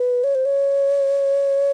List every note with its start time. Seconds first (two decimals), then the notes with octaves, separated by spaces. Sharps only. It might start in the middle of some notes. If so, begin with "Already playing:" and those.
Already playing: B4
0.24 C#5
0.35 C5
0.45 C#5